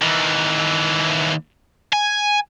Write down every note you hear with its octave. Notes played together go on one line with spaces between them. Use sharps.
D#2 E3
G#5